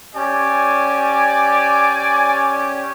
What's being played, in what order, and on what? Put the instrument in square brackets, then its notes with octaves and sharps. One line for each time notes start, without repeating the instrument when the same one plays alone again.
[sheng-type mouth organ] C#4 G4 [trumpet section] D5 G#5